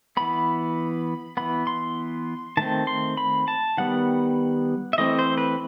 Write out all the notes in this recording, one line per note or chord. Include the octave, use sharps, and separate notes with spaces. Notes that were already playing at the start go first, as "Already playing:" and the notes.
E3 B3 B5
E3 B3 B5
C6
D#3 A3 C4 A5
C6
B5
A5
D#3 G3 B3 F#5
E5
E3 A3 C4 D#5
C5
B4